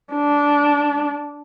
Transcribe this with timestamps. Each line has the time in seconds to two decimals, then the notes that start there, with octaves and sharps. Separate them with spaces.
0.14 D4